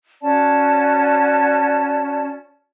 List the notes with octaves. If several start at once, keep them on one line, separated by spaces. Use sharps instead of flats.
C#4 F#4 D5 A5